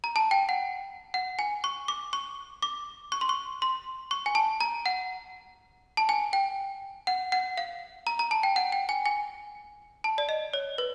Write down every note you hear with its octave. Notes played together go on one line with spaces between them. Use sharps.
A#5
A5
G5
F#5
F#5
G#5
C#6
D6
C#6
D6
C#6
C6
C#6
C6
C#6
G#5
A5
A#5
F#5
A5
G#5
G5
F#5
F#5
F5
A#5
A#5
A5
G5
F#5
G5
G#5
G#5
A5
D5
D#5
C#5
B4